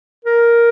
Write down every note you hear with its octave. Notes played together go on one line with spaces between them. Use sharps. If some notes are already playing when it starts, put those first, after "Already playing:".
A#4